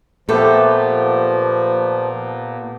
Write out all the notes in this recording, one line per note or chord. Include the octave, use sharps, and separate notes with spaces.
A#2 F3 A3 B3 G4 A4